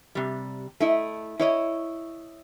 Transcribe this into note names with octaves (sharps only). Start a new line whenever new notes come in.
C3 G3
A3 E4 D#5
E4 C#5 D#5